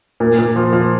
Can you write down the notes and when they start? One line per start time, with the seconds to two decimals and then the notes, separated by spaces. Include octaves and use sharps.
0.20 A#2
0.38 A#2
0.56 F3
0.73 F3